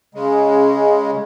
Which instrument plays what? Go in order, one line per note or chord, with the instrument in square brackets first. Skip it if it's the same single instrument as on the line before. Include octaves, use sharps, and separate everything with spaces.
[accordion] C#3 G#3